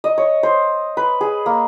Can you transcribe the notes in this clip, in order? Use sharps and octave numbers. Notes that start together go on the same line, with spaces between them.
D#5
C#5
C5
B4
G#4
A#3